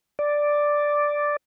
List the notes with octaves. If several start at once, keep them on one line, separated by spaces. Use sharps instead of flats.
D5